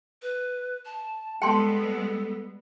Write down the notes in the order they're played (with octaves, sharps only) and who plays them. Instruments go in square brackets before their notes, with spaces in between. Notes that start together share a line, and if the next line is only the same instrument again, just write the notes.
[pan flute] B4
A5
[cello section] G3 G#3 B3 [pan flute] A4 [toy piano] G5 A5 C6